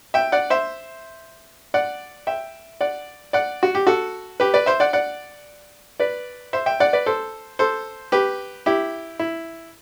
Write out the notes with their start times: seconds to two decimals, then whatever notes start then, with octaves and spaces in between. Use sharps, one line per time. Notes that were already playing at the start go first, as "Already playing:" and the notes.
0.14 E5 G5
0.32 D5 F#5
0.50 C5 E5
1.74 D5 F#5
2.27 E5 G5
2.81 D5 F#5
3.33 D5 F#5
3.63 F#4
3.75 G4
3.87 F#4 A4
4.40 G4 B4
4.54 B4 D5
4.66 C5 E5
4.80 D5 F#5
4.93 D5 F#5
6.00 B4 D5
6.53 C5 E5
6.66 E5 G5
6.80 D5 F#5
6.93 B4 D5
7.06 A4 C5
7.59 A4 C5
8.12 G4 B4
8.66 E4 G4
9.19 E4